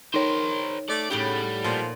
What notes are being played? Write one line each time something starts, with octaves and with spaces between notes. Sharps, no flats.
D#3 D#4 A#4 C5 C#5
A3 D5
A2 C#3 G3 F#5 G5
A#2 F3